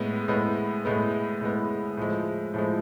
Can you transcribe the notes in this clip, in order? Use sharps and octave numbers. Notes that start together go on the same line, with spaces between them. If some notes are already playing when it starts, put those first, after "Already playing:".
Already playing: A2 G#3 B3
A2 G#3 B3
A2 G#3 B3
A2 G#3 B3
A2 F3 G#3
A2 F3 G#3